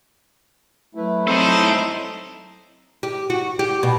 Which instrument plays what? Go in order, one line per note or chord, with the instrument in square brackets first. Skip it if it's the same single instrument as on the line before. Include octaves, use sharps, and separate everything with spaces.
[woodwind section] F#3 B4 [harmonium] A3 E4
[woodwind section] F#3 C4 [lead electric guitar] D#4 A4 [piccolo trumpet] C5
[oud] G4
F#4
G4
B2